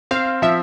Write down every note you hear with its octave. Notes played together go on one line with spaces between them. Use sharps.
C4 F5
F3 E5